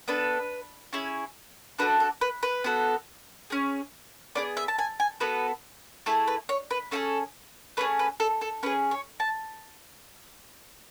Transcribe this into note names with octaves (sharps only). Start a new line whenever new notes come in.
B3 D4 A4 B4
C#4 E4 G#4
D4 F#4 A4 B4
A4
B4
B4
B3 F#4 A4
C#4 G#4
B3 D4 G#4 D5
E5
A5
G#5
G#5
B3 F#4 A4 B4
A3 E4 G#4 A4
B4
C#5
B4
C#4 E4 G#4 A4
A3 C#4 G#4 B4
B4
A4
A4
C#4 G#4 B4
C#5
A5